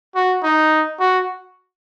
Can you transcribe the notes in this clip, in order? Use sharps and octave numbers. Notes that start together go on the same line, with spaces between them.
F#4
D#4
F#4